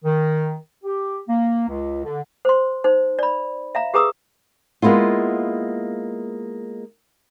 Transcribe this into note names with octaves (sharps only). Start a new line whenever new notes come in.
D#3
G4
A#3
C#2
D3
C5 C6
D#4 C5
D5 B5
E5 F5 A#5
G4 G#4 B4 A#5 D#6 E6
G#3 A#3 B3 E4 F4